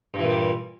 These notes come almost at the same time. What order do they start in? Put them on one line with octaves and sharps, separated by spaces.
G2 E3 A#2 G3